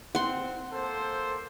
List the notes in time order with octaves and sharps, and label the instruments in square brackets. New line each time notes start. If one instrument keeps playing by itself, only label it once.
[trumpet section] C4 [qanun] F#5 C6
[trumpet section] A#3 A4 C5